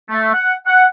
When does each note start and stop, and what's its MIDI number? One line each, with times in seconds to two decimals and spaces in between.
0.10 0.31 57
0.33 0.54 78
0.66 0.84 78